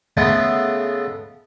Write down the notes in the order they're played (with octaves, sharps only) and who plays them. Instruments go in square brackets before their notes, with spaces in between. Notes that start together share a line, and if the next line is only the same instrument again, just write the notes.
[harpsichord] C#3 G#3 A3 B3